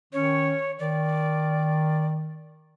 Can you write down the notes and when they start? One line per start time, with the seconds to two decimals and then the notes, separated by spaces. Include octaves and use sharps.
0.13 D#3 C#4 C#5
0.79 D#3 D5